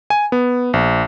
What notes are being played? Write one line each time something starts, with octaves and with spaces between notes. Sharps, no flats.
G#5
B3
A#1